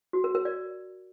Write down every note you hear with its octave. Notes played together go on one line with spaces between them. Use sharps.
F#4
A#4
A#4
D5